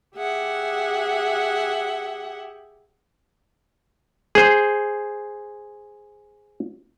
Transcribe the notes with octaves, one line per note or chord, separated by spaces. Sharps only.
G4 G#4 E5 F#5
G#4 C5